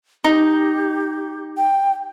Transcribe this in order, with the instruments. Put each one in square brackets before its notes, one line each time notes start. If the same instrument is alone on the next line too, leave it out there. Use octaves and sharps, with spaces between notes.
[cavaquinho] D#4 [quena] G4
[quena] G5